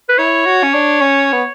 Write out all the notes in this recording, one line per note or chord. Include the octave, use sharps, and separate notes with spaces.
B4
E4 C#5
F#4
C#4
D4
C#4
B3